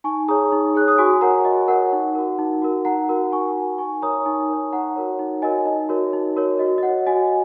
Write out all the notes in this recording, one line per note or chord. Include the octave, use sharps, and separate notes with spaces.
D#4 G#5 C#6
G#4 C#5 A#5 D#6
D#4
G#4 C#5 F#6
D#6
F#4 G#5 C#6
A#4 C#5 F#5 A#5
F#4 D#5
A#4 C#5 F#5
D#4
F#4 A#4
D#4
F#4 A#4
D#4 F#5 A#5
F#4 A#4
D#4 G#5 C#6
F#4 A#4
D#4 G#5 C#6
A#4 C#5 A#5 D#6
D#4 G#5 C#6
A#4 C#5
D#4 F#5 A#5
F#4 A#4 C#5
D#4
F#4 A#4 C#5 D#5 G#5
D#4 D#5
F#4 A#4 C#5
D#4
F#4 A#4 C#5
F#4 D#5
D#5
C#5 F#5
F#4 D#5 G#5